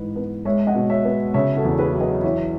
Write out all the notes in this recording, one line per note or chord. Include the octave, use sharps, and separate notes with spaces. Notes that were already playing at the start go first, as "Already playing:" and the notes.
Already playing: G#2 E3 B4 D#5
B3
G#3 C#5 E5
D#5 F#5
B2
C#5 E5
B3
C#3 C#5 E5
F#4 A4
E2
G#4 B4
F#3
B4 D#5
E3 C#5 E5